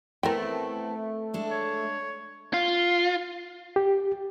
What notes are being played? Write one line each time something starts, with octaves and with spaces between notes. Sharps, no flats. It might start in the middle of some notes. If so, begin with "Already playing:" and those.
A3 B3 C4 E4 A#4 G5
G#3 D4 A4
C#5
F4
G4